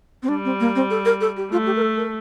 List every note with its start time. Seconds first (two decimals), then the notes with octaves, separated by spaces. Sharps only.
0.23 C4
0.28 G3 D4
0.45 C4
0.60 A#3
0.75 C4
0.90 A4
1.05 A#4
1.21 A4
1.37 G4
1.51 A3 F4
1.66 G4
1.76 A#4
1.82 A4
1.97 A#4